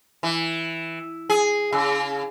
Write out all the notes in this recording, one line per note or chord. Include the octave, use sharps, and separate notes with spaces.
E3
G#4
C#3